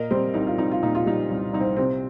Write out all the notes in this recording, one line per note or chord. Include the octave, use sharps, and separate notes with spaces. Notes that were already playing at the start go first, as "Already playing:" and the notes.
Already playing: A#2 A#4 D#5
G3 C4
C2 D#4
F4
C2 D#4
F4
A#2 D#4
F4
G3 D#4
C2
C2 D#4
C4
C3 C4